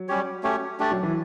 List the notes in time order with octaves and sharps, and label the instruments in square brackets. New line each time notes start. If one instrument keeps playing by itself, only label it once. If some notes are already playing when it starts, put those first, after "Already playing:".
Already playing: [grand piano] F#3
[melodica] G3 C#4 G4 C#5
A3 C#4 G4 C#5
A3 D4 G4 D5
[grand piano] F#3
E3